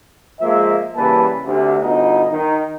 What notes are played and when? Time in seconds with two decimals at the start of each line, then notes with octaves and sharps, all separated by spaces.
0.40 F3 G#3 A#3 E5
0.96 C#3 E3 G3 A#3 B4 A5
1.45 D2 C3
1.81 G1 B2 D#4 D#5
2.31 D#3 D#4